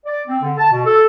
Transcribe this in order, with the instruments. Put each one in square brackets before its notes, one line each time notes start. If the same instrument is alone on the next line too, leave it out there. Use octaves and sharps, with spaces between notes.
[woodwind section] D5
C4
D3
A5
B2
A4